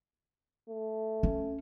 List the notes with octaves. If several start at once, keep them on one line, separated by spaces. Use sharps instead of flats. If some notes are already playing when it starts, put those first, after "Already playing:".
A3
C#4